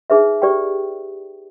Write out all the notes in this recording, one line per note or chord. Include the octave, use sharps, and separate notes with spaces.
D#4 G#4 B4 E5
G4 B4 D5 G5